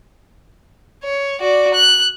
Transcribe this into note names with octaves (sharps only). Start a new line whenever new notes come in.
C#5
F#4 D5
F#6